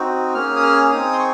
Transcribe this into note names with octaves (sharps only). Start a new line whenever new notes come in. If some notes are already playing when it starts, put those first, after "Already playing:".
Already playing: C4 D#4 F#4
A#3 C#4 G#4 F6
D#6
F6
F6
C4 D#4 G#4 D#6
C6
C#6